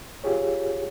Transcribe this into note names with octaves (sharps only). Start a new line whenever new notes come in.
F4 G4 G#4 C#5